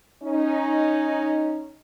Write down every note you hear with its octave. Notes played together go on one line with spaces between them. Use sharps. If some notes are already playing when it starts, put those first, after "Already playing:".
C#4 D#4